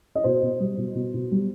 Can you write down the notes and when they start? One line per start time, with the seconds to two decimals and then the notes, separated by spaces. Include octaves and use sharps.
0.15 D#5
0.24 B2 C5
0.42 B2
0.60 G3
0.77 B2
0.95 B2
1.14 B2
1.31 G3